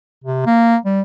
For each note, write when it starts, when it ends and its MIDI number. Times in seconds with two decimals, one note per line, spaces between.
0.24 0.43 48
0.46 0.76 58
0.85 1.01 55